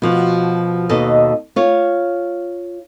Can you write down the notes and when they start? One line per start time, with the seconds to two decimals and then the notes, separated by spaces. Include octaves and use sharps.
0.02 B2 F3 F#4
0.89 D#2 B2 A4 D#5
1.56 F4 C#5